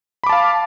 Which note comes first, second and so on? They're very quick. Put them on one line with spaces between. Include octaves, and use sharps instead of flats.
B5 D6 A5 F5